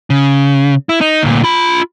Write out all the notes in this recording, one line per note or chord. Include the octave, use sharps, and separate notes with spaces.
C#3
E4
D#4
D2 A#2
F4 B5